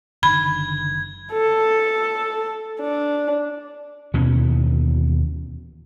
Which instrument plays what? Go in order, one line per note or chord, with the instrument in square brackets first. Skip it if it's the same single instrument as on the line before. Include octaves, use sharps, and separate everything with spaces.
[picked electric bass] F#1 D3 D#3 [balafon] B5 [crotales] G#6
[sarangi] A4
D4
[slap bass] D#2 B2 E3 C#4